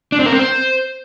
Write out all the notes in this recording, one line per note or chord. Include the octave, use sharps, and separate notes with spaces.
D4
C4
A#4
C4
C5